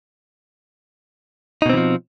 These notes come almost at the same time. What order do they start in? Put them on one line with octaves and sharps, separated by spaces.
D#4 B2 C4 E3 F3